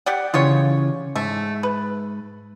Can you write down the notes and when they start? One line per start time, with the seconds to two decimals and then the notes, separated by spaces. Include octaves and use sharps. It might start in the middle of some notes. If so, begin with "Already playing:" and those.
0.06 G4 D5 F#5
0.34 C#3 E3 F4 G4 C#5
1.16 G#2 A3
1.63 B4